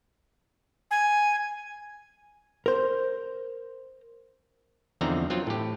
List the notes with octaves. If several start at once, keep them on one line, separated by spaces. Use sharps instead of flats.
G#5
A#4 C5
E2 D3 F3 C4 D#4 A#5
F#3 C4 F4
A2 G4